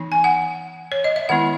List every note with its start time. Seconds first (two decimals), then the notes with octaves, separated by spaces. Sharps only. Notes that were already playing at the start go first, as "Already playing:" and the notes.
Already playing: E3 B3 D#4
0.12 G#5
0.24 F#5
0.92 C#5
1.04 D#5
1.16 E5
1.29 D#3 G#3 B3 E4 F#5